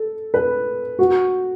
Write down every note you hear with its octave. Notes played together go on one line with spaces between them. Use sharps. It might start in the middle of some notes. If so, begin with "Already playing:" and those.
Already playing: A4
B4
F#4